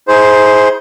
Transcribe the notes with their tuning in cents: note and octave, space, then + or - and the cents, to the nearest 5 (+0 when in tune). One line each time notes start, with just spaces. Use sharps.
E4 -45 G#4 +5 C5 +0